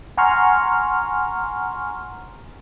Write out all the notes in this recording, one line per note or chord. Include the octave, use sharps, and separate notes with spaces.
F#5 G#5 A#5 C6 C#6 F6